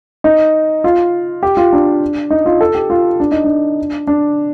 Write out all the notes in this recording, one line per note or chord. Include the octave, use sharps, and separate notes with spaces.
D#4
F4
G4
F4
D4
D#4
F4
A4
G4
F4
D4
D#4
D4
D4